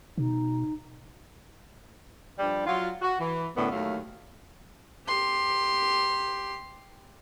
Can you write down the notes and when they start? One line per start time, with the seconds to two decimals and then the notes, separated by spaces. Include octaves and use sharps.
0.18 B2 D#4
2.39 G2 F3 G3
2.67 F#3 F4
3.02 F#4
3.20 E3
3.56 F#2 A2 D3 B3
3.72 D#2 A2 F#3 A3 F5
5.07 G4 C6